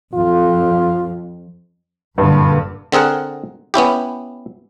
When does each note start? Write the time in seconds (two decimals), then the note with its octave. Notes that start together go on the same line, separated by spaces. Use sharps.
0.14 F2 F4
2.18 F#1 G2 A#2 D3
2.92 D3 C4 G#4 A#4 F#5
3.74 B3 C#4 E4 G4